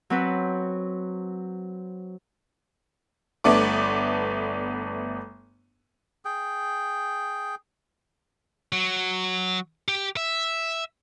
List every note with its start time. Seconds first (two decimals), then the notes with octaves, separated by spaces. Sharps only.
0.10 F#3 C4 B4
3.44 G1 A3 B3 D4 D6
6.25 G#4 G5
8.73 F#3
9.88 G4
10.17 E5